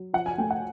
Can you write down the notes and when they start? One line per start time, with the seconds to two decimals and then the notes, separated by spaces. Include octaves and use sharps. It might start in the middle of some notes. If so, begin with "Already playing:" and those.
Already playing: F#3
0.13 F3 F#5
0.26 G#5
0.38 A3 G5
0.51 F#5